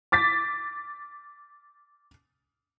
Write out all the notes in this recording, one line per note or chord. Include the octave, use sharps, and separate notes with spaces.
D6 A6 B6